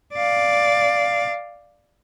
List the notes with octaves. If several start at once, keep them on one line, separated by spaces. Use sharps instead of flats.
D5 F5